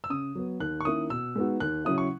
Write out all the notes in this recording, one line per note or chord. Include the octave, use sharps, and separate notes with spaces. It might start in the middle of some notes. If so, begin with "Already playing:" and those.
E6
C#3 D#6
F#3 B3
D#2 F#6
C#6
D#3 A#3 C#4 E4 D#6
B2 E6
G#3 B3 D#4 F#4
D#2 F#6
C#3 F#3 C#4 E4 D#6
C#6